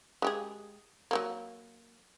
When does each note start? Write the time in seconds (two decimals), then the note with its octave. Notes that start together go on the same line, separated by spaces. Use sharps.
0.22 G#3 G4 G#4
1.11 F#3 A3 A#3